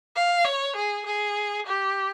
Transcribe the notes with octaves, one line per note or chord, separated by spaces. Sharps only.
F5
C#5
G#4
G#4
G4